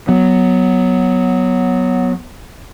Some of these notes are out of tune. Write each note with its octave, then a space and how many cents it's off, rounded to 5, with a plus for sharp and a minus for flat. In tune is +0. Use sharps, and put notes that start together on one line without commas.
F#3 -5 B3 +0